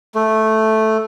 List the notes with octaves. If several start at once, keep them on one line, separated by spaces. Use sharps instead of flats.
A3